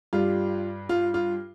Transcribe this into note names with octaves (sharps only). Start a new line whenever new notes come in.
G2 G3 F4
F4
F4